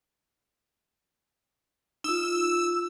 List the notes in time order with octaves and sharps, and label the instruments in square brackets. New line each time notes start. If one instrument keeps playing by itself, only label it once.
[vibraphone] D#4 F4 [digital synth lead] E6